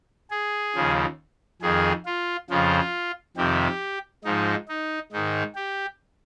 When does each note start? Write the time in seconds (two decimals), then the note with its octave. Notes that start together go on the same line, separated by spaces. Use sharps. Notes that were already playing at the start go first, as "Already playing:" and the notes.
0.30 G#4
0.75 D#2 C#3 F3
1.62 F2 D#3 G#4
2.06 F4
2.50 F2 C#3 F3 F4
3.37 F2 C3 D#3 G4
4.24 G#2 F3 D#4
4.68 D#4
5.12 G#2 D#3 D#4
5.56 G4